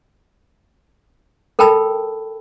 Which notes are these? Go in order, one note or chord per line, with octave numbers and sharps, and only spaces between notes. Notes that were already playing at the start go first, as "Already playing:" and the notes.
A4 A#4 G5 A5 B5 E6